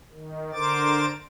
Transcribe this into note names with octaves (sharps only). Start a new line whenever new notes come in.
D#3
D3 A#4 C5 D6 A6